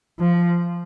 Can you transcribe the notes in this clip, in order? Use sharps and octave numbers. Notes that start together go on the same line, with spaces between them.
F3